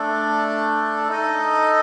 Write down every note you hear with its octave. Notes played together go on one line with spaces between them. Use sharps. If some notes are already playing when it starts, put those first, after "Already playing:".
Already playing: A3 D4 A4
D#4 A4 D#5